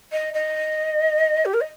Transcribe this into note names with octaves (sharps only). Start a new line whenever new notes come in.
D#5
D#5
G4
A#4
D#5